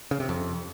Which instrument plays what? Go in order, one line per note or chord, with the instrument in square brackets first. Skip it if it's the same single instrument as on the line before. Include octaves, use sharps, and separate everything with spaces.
[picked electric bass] C#3
C3
F2